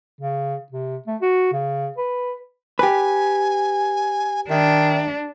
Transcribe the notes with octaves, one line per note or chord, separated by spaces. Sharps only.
C#3
C3
A3
F#4
C#3
B4
G4 B4 G#5
D#3 D4 E5